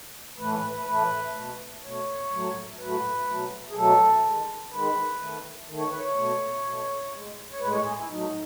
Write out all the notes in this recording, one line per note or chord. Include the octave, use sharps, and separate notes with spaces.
A2 E3 A3 B4
B4
B4
A2 E3 A3 B4
B2 A3
B2 A3 C#5
A2 F#3 A3
A2 F#3 A3 B4
B2 F#3 A3
G#4
B2 F#3 A3 A4
D#3 G#3
D#3 G#3 B4
D#3 A3
D#3 A3
C#5
B4
C#5
B2 A3
B2 A3
A2 G#3
C#5
A2 G#3 B4
C#5
G#4
E4
A2 F#3 A3 D#4